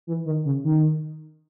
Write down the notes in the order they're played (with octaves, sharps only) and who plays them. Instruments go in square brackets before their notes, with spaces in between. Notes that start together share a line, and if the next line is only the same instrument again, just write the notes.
[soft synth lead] E3
D#3
C#3
D#3